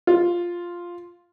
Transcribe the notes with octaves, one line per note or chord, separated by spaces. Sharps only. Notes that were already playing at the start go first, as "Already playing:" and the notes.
F4